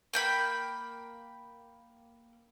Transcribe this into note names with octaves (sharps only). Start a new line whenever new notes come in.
A#3 G5 B5